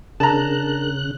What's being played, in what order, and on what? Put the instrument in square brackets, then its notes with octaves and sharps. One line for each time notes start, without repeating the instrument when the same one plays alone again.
[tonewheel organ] C#3 F#6 [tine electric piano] D4 G#4 A#4 [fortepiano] A5 A#5